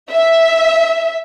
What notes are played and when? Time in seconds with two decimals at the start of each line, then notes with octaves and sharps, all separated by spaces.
0.12 E5